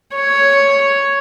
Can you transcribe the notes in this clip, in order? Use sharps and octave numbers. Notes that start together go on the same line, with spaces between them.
C#5